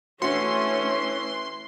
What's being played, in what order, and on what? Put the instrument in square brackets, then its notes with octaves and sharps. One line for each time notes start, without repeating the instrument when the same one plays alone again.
[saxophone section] E3 [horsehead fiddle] A3 C#4 [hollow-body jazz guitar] D4 F#4 [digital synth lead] C6